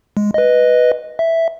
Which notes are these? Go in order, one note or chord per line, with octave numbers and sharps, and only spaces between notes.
G#3
B4 D#5
E5